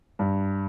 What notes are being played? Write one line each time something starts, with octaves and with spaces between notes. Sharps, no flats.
G2